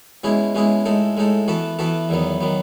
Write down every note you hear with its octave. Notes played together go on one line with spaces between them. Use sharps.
B2 G#3 C#4 E4 G#4
B2 G#3 C#4 E4 G#4
A2 G#3 D#4 A4
A2 G#3 D#4 A4
E3 B3 F#4 A4 E5
E3 B3 F#4 A4 E5
E2 D#3 F#3 B3
D#3 F#3 B3